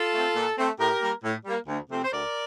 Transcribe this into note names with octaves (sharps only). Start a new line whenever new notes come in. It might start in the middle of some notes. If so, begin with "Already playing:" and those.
Already playing: F4 A4
A3 C4
A#2
A3 C4
A2 G4 A#4
G3 A#3
A2
G3 A#3
D2
C3 F3 A3 C4
C5
D2 A#4 D5